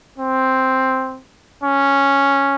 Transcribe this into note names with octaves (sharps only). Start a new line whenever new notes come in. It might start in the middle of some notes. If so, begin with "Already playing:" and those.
C4
C#4